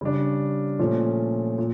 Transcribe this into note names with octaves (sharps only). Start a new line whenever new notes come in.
C#3 G3 D4
A#2 F3 A3 C#4
A#2